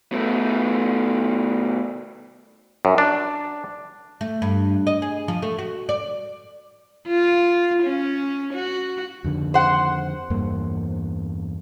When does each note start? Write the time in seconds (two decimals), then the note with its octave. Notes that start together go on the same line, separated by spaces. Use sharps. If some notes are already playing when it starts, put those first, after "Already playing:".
0.12 B2 A3
2.85 F#2
2.98 D4
4.21 A3
4.42 G2
4.87 D#5
5.02 G#4
5.28 F3
5.42 A3
5.59 F#4
5.89 D5
7.07 F4
7.83 C#4
8.54 F#4
9.24 F2 D3 D#3
9.54 C5 F#5
10.30 E2 G2 A#3